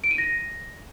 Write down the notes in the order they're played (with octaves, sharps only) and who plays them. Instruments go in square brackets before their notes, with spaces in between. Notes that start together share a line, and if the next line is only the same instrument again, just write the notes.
[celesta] D7
D#7
A#6